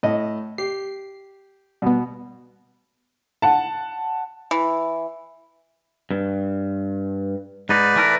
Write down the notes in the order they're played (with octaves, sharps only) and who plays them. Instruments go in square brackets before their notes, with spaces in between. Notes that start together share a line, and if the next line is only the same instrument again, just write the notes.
[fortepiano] A2 D#5
[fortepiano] G4 [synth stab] C7
[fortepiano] B2 [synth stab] G3 B3
[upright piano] F#5 A5
[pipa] E3
[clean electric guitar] G2
[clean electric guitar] G#2 D#4 [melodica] B4 D5
[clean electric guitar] E3 A3 A#4